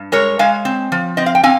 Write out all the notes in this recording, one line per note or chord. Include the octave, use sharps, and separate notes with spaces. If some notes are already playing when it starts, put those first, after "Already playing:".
Already playing: G2
G#3 A#4 C#5
G#3 F5 G#5
C4
F3
C4 D#5
F5
G5
C4 F5 G#5